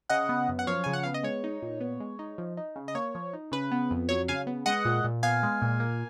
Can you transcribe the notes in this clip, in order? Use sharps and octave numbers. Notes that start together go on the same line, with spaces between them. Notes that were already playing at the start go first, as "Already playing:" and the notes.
C#3 D#5 F#5
B3
F#2
F#5
F3 C#5 F5
C#3 G#5
F#5
B3 F5
D#5
G#3 C#5
D#4
A#2
B3
G#3
D#4
F3
D#4
C#3
D#5
A#3 C#5
F3
D#4
C#3 B4
B3
F2
F#3 C#5
C#3 F5 G#5
B3
G#3 D#5 F#5
A#2
A#2
B3 F5 G#5
G#3
A#2
A#3